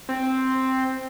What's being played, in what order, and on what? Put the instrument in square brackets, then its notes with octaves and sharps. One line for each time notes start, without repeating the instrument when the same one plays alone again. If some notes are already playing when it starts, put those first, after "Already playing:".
[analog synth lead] C4